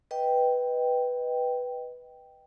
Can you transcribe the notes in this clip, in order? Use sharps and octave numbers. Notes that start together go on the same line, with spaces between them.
B4 D#5 G5